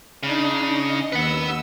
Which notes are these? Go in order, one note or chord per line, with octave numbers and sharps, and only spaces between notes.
C#3 D4 D#4
D#5
D#2 B4 F#5 E6